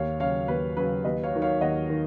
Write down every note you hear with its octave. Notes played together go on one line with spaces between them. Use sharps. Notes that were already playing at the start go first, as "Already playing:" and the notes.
Already playing: D#2 C#5 F5
C#3 F#3 C#5 F5
D#2 B4
C#3 F#3 B4
D#2 B4 D#5
C#5 F5
D#3 F#3
C#5 F5
D#2 D#5 F#5
D#3